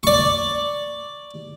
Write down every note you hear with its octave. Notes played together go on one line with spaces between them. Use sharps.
D5 C#6